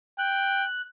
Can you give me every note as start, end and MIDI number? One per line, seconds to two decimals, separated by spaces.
0.19 0.65 79
0.19 0.82 90